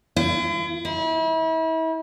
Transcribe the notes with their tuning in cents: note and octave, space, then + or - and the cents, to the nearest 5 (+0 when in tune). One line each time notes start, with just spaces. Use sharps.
E4 +45
E4 -35